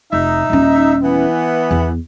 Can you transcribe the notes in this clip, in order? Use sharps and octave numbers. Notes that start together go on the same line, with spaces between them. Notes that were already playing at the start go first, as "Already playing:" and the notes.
F1 D#4 E5
D#1 C#4
E3 B3
E2